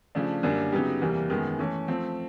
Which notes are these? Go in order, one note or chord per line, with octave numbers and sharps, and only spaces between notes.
C#3 F3 A3 D4
F#2 D3 G3 A#3 D4
C#3 F#3 B3 D#4 G4
E2 C3 E3 G3 A#3
F#2 D#3 G#3 B3
E3 A3 C#4
F3 A3 C4